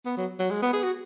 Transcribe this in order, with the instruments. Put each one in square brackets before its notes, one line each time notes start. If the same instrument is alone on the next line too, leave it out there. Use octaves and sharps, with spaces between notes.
[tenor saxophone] B3
F#3
F#3
G#3
B3
G#4
F#4